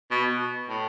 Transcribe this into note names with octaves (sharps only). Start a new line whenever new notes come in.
B2
A2